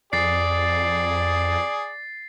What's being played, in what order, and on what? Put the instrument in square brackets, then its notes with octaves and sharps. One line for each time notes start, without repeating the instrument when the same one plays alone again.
[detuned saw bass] F2 [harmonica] G#4 [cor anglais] D5 [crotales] A6 C7